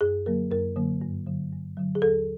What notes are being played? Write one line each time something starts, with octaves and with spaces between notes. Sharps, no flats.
F#2 G#4
D3 F#3 A#3 A#4
F#2 A#4
D3 F#3 A#3
G2
D3 F#3
G2
D3 F#3
G#4
D#2 A4